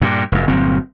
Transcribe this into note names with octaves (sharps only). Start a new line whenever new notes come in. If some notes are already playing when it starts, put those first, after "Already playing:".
G2 A#2
F1 F#2
G1 A#2 F#3 C4